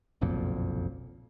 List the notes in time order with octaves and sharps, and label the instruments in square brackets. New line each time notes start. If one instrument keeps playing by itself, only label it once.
[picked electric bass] F#1 B1 F2 A#2